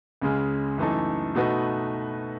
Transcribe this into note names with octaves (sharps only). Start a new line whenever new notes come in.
C#2 C#3 G#3
F#2 E3 A3 D#4 A4
B2 A3 D#4 F#4 B4